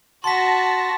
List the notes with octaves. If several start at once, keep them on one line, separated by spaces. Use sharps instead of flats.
F#4 A5 C6 A#6 B6